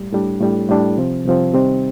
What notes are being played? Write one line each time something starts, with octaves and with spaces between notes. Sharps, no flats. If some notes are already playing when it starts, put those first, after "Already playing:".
Already playing: A2 G3
A2 G3 D4
A2 G3 D4
A2 G3 D4
C2 C3 F3 C4
C2 C3 F3 C4
C3 D#3 G3 C4 D#4